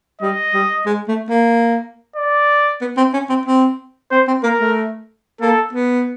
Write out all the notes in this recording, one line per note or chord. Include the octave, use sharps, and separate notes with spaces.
G3 D#5
G3
G#3
A3
A#3
D5
B3
C4
C#4
C4
C4
C4 C5
C4
A#3 A#4
A3
A#3 A4
B3